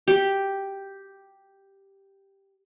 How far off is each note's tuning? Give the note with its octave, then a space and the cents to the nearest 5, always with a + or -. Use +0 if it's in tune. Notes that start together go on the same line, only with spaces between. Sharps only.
G4 +0